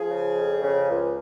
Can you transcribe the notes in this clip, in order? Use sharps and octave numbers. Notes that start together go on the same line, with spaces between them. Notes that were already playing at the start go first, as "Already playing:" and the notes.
Already playing: F3 G#4
C#3
F2
C#3
C#2